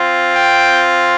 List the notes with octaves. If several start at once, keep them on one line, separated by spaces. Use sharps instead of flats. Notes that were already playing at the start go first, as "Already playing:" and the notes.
Already playing: C4 F4
G5